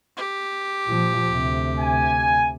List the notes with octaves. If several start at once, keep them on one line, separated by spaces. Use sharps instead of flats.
G4
A#2 F3
D2 C3
G#5